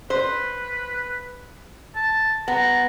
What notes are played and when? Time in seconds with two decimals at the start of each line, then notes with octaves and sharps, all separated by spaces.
0.10 B4 C5
1.96 A5
2.48 B3 A#5